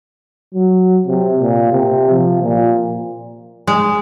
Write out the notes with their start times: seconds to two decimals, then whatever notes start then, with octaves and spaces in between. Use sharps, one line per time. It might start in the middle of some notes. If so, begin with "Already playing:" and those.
0.55 F#3
1.07 C3
1.41 A#2
1.72 C3
2.11 F3
2.42 A#2
3.67 G#3